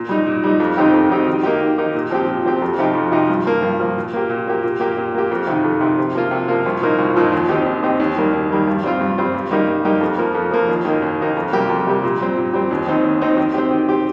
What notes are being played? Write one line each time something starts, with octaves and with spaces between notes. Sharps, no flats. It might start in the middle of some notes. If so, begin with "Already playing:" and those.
Already playing: A#2
G3 D#4
A#2
G3 D#4
F2
D#3 C4 D#4 G4
F2
D#3 C4 D#4 G4
D#3
A#3 D#4 G4
D#3
A#3 D#4 G4
A#2
F3 C4 G4
A#2
F3 C4 G4
F2
C3 F3 D#4 G4
F2
C3 F3 D#4 G4
G2
F3 A#3
G2
F3 A#3
A#2
A#3 G4
A#2
A#3 G4
A#2
A#3 G4
A#2
A#3 G4
F2
C3 D#3
F2
C3 D#3
C3
F3 A#3 F4
C3
F3 A#3 F4
C2
A#2 F3 A#3 D#4
C2
A#2 F3 A#3 D#4
D#2
D#3 C4 D#4 G4
D#2
D#3 C4 D#4 G4
D#2
D#3 G3 A#3
D#2
D#3 G3 A#3
G2
G3 C4 F4
G2
G3 C4 F4
G2
G3 A#3 D#4 G4
G2
G3 A#3 D#4 G4
F2
F3 A#3
F2
F3 A#3
D#2
D#3 A#3 D#4
D#2
D#3 A#3 D#4
F2
C3 G3 A#3 G4
F2
C3 G3 A#3 G4
A#2
G3 C4
A#2
G3 C4
D#2
D#3 C4 D#4
D#2
D#3 C4 D#4
D#3
C4 G4
D#3
C4 G4